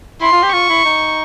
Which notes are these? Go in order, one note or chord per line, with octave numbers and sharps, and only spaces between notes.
E4 C6
F4
G4
F4 C#6
E4
D#4